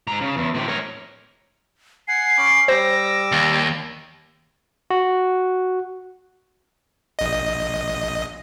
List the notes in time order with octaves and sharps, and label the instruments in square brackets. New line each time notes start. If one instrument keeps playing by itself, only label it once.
[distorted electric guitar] G#2 A#5
C#3
E2
A2 C4
A#4 C#5
[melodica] F#5 G#5 [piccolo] C7
[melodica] C#4 B5 D6
[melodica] G3 D6 E6 [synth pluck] C5 [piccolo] A#6
[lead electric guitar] D#2
[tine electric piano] F#4
[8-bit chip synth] A#1 D#5